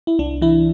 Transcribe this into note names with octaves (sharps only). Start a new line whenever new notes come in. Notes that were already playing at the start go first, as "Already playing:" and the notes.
E4
C2 D4
E3 E4